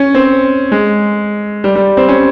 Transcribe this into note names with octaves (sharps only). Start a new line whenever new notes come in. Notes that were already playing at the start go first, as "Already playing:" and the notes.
Already playing: C#4
C4
G#3
G3
G3
C4
C#4